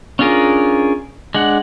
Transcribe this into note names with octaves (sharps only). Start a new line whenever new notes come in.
C#4 D4 F4 G#4 A#4
G#3 D4 F#5